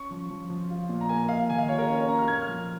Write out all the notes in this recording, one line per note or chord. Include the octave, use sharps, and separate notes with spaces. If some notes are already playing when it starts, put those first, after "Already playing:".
Already playing: C#4 C#6
F3
F3
F3
F4
A#2
A#5
A#3 G#5
A#2 F5
D#3 G#5
F5
F4 C#5
A#4
C#4 C#5
C#5
F4 A#5
F6
A#2 G#6
F6
F3